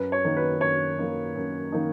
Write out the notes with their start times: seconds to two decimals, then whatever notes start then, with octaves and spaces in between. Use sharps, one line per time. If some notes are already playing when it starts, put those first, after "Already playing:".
Already playing: F#2 B4
0.12 C#5
0.25 D#3 A#3 D#4
0.37 B4
0.61 F#2 C#5
0.98 D#3 A#3 D#4
1.35 F#2
1.72 D#3 A#3 D#4